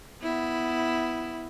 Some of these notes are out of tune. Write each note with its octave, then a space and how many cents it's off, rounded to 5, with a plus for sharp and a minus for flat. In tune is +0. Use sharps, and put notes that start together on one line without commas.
B3 +15 E4 +0